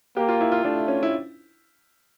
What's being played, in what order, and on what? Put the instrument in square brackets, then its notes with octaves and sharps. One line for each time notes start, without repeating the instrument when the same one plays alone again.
[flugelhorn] A#3 [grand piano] G4
[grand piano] F4
E4
F4
[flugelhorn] A3 [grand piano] D4
[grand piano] C#4
E4